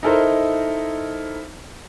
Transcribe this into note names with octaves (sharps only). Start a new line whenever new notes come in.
D#4 E4 A4 A#4 C5 D#5